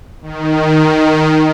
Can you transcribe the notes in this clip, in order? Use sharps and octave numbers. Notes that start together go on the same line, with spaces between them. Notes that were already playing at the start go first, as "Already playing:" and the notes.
D#3